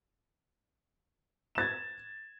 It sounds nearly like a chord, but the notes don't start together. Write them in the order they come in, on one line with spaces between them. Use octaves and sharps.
E7 A6 G#6